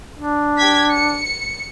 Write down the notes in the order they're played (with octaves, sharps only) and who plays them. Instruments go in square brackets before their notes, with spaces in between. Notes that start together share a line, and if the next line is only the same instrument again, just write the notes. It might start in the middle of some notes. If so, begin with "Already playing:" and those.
[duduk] D4
[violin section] G4 G#6 B6
C#7